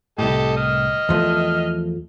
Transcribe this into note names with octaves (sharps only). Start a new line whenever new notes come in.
C2 A2 G4 A4 D#5
D#5 F6
E2 F3 A3